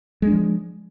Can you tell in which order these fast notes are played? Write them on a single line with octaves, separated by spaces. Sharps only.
G#3 D4 F3